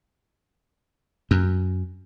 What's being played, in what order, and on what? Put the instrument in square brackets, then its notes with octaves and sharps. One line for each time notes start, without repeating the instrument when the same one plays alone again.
[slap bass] F#2